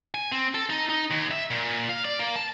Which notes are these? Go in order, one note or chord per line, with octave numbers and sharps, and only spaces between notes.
G#5
C4
A4
D#4
D#4
D#2
E5
A#2
F5
D5
A#3
A5